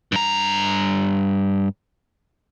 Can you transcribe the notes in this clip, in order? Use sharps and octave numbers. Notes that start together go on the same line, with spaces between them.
G2 A#5